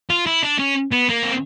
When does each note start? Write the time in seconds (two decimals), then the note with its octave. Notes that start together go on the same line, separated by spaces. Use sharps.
0.10 F4
0.27 E4
0.43 D4
0.59 C#4
0.92 B3
1.10 A#3
1.23 C4